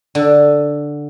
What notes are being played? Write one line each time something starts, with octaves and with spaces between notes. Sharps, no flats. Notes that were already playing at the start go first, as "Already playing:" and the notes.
D3